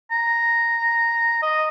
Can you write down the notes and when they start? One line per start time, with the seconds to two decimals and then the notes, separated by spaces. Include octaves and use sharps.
0.11 A#5
1.42 D#5